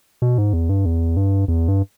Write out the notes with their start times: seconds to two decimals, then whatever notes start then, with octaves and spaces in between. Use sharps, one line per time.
0.22 B2
0.38 G#2
0.53 E2
0.69 G2
0.85 E2
1.17 G2
1.48 E2
1.68 G2